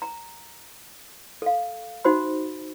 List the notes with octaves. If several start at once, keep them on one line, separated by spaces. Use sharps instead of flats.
A#5
A4 F5
D#4 F#4 C5 B5